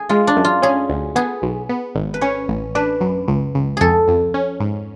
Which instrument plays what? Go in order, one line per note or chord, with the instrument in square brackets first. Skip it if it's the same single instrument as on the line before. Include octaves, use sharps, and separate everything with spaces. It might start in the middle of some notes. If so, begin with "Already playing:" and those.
Already playing: [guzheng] G#4
[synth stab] G#3 [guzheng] F4
[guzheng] D4
[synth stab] F#2
[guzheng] F4
[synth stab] C#4 [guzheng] G#4
[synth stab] D2
[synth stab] B3 [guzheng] G#4
[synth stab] B1
B3
G#1
[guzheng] B4
[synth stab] C#4 [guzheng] C#5
[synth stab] A1
[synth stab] D4 [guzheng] B4
[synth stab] F#2
C#2
C#2
[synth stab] F2 [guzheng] G#4 A4
[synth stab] F2
C#4
G#2